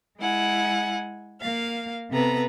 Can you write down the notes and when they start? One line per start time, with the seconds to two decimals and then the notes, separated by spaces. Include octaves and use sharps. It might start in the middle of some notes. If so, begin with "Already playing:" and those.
0.18 G#3 E4 F#5 G#5
1.40 A#3 F5
2.11 C3 B3 A4 B4 A#5